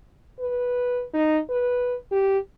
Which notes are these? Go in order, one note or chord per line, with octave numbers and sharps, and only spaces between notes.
B4
D#4
B4
G4